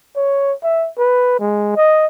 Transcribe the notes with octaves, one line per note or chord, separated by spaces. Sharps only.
C#5
E5
B4
G#3
D#5